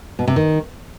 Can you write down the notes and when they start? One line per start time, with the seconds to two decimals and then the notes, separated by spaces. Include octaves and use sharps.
0.19 B2
0.28 C3
0.36 D#3